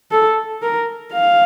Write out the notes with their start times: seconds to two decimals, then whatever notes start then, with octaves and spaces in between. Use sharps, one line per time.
0.11 A4
0.62 A#4
1.13 F5